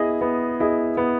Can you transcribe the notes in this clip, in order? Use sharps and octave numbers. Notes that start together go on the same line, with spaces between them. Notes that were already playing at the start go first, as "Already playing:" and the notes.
Already playing: B3 E4 G#4 D#5
B3
E4 G#4 D#5
B3